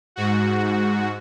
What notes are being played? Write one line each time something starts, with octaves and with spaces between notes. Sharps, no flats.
G#2 F#4